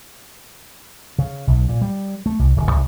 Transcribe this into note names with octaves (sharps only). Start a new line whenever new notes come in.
C#3
B1
A#2
G3
A3
C2
D1
C2